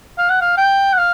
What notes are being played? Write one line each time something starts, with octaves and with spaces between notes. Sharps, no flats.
F5
F#5
F5
G5
F#5
F5